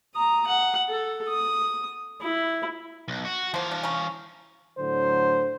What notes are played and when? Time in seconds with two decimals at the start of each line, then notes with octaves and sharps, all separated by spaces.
0.15 A#5 D#6
0.46 F#5
0.89 A4
1.29 D#6
2.21 E4
3.08 B1
3.25 F#4
3.54 E3 F3 A#3 F5
3.71 D4
3.83 C#4 A#5
4.78 A2 D3 F#3 C5